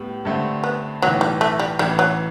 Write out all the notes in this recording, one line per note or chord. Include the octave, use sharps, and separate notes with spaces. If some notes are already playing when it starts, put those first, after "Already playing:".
Already playing: A2 G3 B3
G2 D3 A3 C4
B3
B1 A2 E3 F#3
G3
A3
G3
A1 A2 E3 G3
F#3